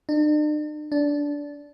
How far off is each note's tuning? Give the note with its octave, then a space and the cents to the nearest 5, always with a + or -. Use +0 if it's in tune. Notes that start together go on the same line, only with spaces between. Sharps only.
D4 +45
D4 -15